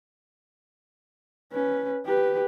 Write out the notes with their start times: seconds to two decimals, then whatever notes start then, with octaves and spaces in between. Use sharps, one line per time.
1.52 C#4 B4
2.06 G4 B4